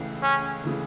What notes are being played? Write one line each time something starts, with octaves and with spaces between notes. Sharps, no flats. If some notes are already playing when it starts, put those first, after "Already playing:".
Already playing: C#2 C#3 E3 A3
C#4
C#3 E3 A3